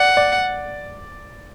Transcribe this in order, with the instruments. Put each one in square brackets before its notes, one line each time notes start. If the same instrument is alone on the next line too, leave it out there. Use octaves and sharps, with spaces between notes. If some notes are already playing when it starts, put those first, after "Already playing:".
Already playing: [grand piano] D5 [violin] F#5
[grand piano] D5